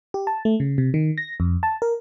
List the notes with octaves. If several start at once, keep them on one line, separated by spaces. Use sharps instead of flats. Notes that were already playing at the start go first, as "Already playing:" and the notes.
G4
A5
A3
C#3
C3
D#3
A#6
F2
A5
A#4